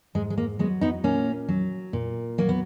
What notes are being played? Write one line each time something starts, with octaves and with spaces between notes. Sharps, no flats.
G#2 G#3
G#3
A#3
F#3 G#3 B3
B3 D#4
A#2 A#3 C#4
F#3
A#2
F#3 A#3
B3